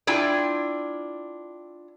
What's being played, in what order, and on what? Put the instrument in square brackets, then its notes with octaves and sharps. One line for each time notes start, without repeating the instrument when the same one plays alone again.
[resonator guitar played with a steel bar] D4 E4 F4 G5